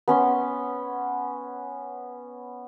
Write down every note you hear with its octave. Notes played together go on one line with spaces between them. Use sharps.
B3 C#4 C6